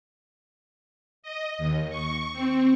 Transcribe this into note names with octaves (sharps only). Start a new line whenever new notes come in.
D#5
D#2
C#6
C4